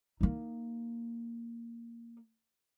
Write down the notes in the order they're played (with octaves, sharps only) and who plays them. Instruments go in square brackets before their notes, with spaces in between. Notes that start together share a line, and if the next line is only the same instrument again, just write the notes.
[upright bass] A#3 D#4